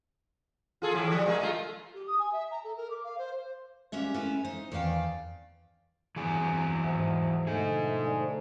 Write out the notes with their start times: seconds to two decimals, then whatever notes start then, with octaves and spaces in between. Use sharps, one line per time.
0.82 F4 G#4 A4
0.94 A2 E3 E4
1.10 F3 G3
1.26 G#3 A#3 G#4
1.39 G#3 A3 F4
1.94 G4
2.07 D#6
2.19 G#5
2.32 E5
2.51 A#5
2.64 A4
2.77 A#4
2.90 D6
3.04 F5
3.18 C5
3.92 G3 G#3 A#3 C#4 E5
4.14 G#3 A3 B3 C#4 E4 B4
4.45 D#4 C5
4.72 E2 D#3 D5 F5 G5
6.16 G2 E3 F#3 C4 G#4
6.83 D#2 G#2 C5 E5 F#5
7.47 B2 D3 F3 A3 D#4 G#4
8.05 C5 D5 G#5